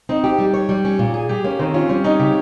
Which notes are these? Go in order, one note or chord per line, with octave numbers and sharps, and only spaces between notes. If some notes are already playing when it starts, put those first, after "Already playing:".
C4 D#4
G4
G3
C#5
G3
C#4
A#2
G#4
G3 G4
A#3 C#4
D#3 C4
C#4 F4
G3 C#4
C#4 D#4
C#3 G4